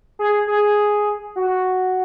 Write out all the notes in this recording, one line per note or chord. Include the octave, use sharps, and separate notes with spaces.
G#4
G#4
F#4